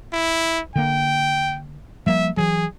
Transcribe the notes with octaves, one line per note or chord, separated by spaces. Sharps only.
E4
D3 A#3 G5
F3 G3 A#3 E5
E3 F#3 G#4